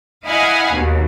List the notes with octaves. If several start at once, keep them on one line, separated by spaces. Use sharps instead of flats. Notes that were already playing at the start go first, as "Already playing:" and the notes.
E4 D#5 F5 F#5 G#5
D#2 B2